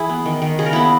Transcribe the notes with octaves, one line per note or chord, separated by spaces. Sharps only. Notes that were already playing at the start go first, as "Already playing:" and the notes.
Already playing: E3 E4 G#4
B3
D#3
D#3
C#3 G#4
A#4
B3 E4 G#4